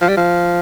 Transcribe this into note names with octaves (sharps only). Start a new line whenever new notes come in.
F3
G3
F3